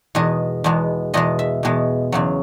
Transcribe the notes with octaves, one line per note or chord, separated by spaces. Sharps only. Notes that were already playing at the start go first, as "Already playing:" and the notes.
E2 B2 G#3 D#5
E2 B2 G#3
E2 B2 G#3 D#5
E5
E2 B2 G#3
E2 C#3 F#3